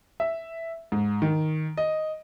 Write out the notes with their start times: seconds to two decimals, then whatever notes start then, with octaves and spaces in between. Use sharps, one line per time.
0.20 E5
0.92 G#2
1.22 D#3
1.77 D#5